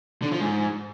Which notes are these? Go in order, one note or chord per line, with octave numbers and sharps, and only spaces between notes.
D3
F3
G#2